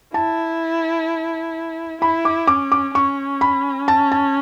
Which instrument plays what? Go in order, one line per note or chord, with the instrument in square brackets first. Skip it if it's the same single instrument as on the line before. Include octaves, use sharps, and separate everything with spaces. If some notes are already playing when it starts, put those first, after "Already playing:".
[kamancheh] E4 [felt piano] A5
[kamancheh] E4 [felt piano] B5
[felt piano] D6
[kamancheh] C#4 [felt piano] D6
[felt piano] D6
[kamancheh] C#4 [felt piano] C#6
[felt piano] B5
A5
A5